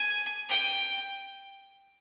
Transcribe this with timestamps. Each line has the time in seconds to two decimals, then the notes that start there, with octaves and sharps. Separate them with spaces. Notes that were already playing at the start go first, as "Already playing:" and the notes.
Already playing: G#5
0.49 G5